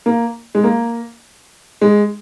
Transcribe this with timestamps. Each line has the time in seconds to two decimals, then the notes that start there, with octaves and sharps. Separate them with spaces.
0.06 A#3
0.55 G#3
0.64 A#3
1.81 G#3